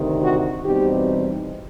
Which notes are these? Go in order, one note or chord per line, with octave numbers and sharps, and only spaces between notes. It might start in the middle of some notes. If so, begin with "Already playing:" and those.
Already playing: D2 C3 D#3
F#4
E2 B2 G3 C4 D#4 G4